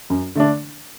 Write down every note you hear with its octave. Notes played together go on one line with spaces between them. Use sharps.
F#2
D3 A3 D4